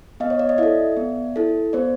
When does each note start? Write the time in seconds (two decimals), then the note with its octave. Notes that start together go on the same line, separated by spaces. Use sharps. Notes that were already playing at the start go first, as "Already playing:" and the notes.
0.20 B3 D#5 F5
0.30 C#5
0.39 D5
0.49 D#5
0.58 E4 A4 D5 E5
0.97 B3
1.36 E4 A4
1.73 B3 C5 D5